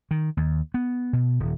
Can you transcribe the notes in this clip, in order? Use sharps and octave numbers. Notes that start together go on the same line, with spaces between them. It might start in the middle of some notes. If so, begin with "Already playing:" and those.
D#3
D#2
B3
B2
D#1